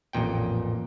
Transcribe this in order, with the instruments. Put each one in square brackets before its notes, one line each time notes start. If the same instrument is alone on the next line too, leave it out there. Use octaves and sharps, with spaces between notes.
[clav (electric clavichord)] A1 F2 A#2 G5